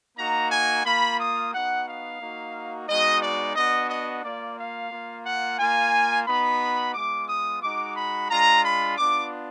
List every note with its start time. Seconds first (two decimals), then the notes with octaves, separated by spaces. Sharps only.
0.18 A#3 D#4 F#4 A#5
0.51 G#5
0.86 A#3 F4 B5
1.20 D#6
1.53 B3 D#4 F#4 F#5
1.87 F5
2.21 A#3 D#4 F#4
2.88 G#3 B3 D#4 F#4 D#5
3.23 D5
3.56 B3 D4 F#4 D#5
3.90 D#5
4.24 A#3 F4 D5
4.58 F5
4.92 A#3 F4
5.26 F#5
5.59 A#3 F4 G#5
6.27 B3 D#4 F#4 B5
6.94 G#3 B3 F4 D6
7.29 D#6
7.62 G#3 D#4 F#4 D6
7.96 B5
8.31 G#3 D4 F4 A#5
8.64 B5
8.98 B3 D4 F4 D6